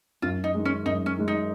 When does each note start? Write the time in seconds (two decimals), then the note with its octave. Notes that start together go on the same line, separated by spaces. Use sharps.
0.22 F#2 F4
0.44 D#4
0.54 D#3 G#3
0.65 C#4
0.85 F#2 D#4
1.06 C#4
1.17 D#3 G#3
1.28 D#4